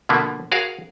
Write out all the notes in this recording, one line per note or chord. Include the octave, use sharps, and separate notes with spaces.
B2 D3 F3 A#3 B3
F#4 G#4 A#4 C#5 F5